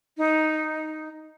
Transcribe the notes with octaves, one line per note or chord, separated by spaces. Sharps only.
D#4